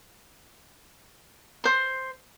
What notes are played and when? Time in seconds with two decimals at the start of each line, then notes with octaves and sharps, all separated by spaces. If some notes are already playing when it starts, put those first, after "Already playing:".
1.64 C5 C6